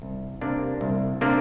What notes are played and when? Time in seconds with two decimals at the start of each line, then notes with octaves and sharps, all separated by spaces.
0.02 C2
0.41 C3 A#3 D4
0.81 C2
1.21 C3 A#3 D4